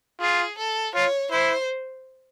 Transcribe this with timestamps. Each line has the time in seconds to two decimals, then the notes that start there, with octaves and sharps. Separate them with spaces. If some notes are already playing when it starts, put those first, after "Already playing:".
0.20 F4 G#4
0.58 A4
0.95 F4 C#5
1.31 E4 C5